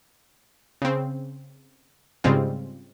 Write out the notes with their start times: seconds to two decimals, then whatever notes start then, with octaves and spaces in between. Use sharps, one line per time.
0.82 C#3 C4
2.24 G#2 C#3 G3 G#3 C4 F4